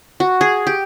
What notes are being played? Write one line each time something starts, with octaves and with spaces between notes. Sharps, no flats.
F#4
G#4
G4